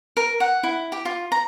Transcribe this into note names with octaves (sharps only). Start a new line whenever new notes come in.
A#4
F#5
E4
G4
F4
A#5